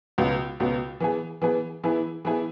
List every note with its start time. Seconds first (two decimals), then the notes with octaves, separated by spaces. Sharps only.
0.18 C#2 B2 B3
0.60 C#2 B2 B3
1.00 E3 B3 G#4
1.42 E3 B3 G#4
1.84 E3 B3 E4 G#4
2.25 E3 B3 E4 G#4